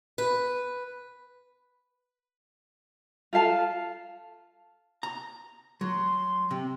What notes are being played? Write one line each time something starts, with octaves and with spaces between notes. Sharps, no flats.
B4
F4 A4 F5 A5
A#5
F#3 C6
C3